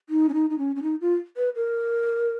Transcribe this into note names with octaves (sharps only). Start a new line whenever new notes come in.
D#4
C#4
D#4
D#4
C#4
C#4
D#4
F4
B4
A#4